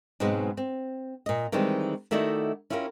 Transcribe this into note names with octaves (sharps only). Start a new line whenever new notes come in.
G#2 B2 F#3 G#3 B3 C4
C4
A#2 D#5
D#3 E3 G3 G#3 C4
D#3 A3 E4 F#4 D5 D#5
C#4 E4 F4 G4 A4 A#4